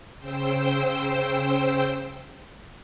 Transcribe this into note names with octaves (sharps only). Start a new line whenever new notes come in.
C#3 C5 G5 E6